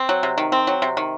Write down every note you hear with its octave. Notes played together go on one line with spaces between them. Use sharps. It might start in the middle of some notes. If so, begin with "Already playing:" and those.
Already playing: C4
F#3
C3
D#3
C4
F#3
C3
D#3